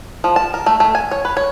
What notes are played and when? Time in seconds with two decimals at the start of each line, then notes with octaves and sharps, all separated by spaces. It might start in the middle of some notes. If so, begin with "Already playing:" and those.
0.24 F3
0.36 A5
0.54 A#4
0.66 A3
0.80 A3
0.95 G#5
1.11 C#5
1.25 B4
1.37 C#5